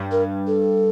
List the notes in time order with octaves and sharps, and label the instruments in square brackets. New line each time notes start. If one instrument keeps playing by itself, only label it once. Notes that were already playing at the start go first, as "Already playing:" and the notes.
Already playing: [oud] G2
[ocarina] A#4
A4